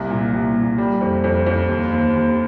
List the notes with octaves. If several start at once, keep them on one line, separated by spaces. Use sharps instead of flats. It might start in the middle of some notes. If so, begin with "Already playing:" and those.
Already playing: C2 A#3
A#2
C2
A#2
G3
F2
F2
F2
D#2
D#2
D#2